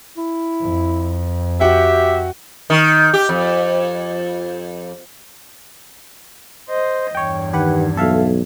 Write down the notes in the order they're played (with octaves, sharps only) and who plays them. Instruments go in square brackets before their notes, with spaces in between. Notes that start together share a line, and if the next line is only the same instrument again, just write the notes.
[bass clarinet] E4
[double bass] F2
[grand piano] F#4 F#5 G5 [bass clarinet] G4 [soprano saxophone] E5
[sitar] D#3
G4
F2
[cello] C5 D#5
[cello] E2 G2 [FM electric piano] C#5 G5
[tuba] D#3 [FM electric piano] G4 B4 F#5
[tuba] B1 [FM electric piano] A4 E5 F5